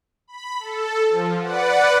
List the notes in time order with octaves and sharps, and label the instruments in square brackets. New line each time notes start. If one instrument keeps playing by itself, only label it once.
[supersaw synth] B5
A4
F3
B4 D5 F#5